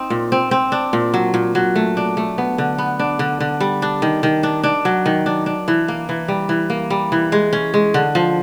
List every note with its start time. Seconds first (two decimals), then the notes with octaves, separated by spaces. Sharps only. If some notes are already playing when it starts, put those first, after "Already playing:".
Already playing: C4 D#4
0.10 A#2
0.32 C4
0.51 C4
0.72 D4
0.93 A#2
1.14 F#3
1.34 A#2
1.55 F#3
1.75 A3
1.97 D4
2.17 A3
2.38 B3
2.58 D3
2.78 B3
2.99 D4
3.19 D3
3.40 D3
3.60 G3
3.82 D4
4.02 D#3
4.23 D#3
4.43 D4
4.63 D4
4.85 F#3
5.06 D#3
5.26 D4
5.46 D4
5.68 E3
5.88 A#3
6.09 E3
6.28 G3
6.49 E3
6.70 A#3
6.90 G3
7.12 E3
7.32 G#3
7.53 C#4
7.74 G#3
7.94 D3
8.15 F3